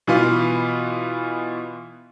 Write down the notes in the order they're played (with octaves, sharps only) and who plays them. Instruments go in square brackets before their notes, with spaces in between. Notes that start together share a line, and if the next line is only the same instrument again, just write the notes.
[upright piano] B2 E3 B3 F4